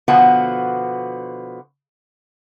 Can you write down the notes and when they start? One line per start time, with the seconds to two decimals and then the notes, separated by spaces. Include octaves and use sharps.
0.08 B2 D3 F3 B3 F#4 F#5